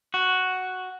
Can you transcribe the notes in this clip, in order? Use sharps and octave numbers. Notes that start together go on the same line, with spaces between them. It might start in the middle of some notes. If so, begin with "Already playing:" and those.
F#4